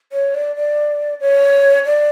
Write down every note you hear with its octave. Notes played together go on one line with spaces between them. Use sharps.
C#5
D5
D5
C#5
D5